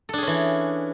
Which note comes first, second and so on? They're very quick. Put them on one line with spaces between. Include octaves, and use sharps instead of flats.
A4 D4 G#4 C#4 E3